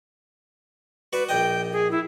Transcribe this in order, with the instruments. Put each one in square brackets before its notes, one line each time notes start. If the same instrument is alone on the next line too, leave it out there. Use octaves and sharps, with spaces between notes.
[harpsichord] F#4 D5 [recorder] B4
[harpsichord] A#1 D5 D#5 [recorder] G5
[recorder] G#4
E4